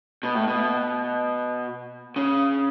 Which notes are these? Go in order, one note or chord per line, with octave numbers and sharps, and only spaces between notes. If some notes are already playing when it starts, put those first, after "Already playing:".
B2
A2
B2
C#3